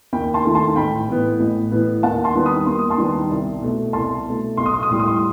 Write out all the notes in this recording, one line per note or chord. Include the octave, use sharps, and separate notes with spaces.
D#2 G5 B5
A5 C6
D#3 A3
A5 C6
A1 G5 B5
A2 E3 B3
A1
A2 E3 B3
D#2 F#5 A5
A5 C6
D#3 G3 B3
B5 D#6
D#2 C6
D#6
A5 C6
D#3 G3 B3
C2
B2 A3
C2 A5 C6
B2 A3
B1 C6
D#6
C6
D#6
A2 G3 C6
D#6
C6
D#6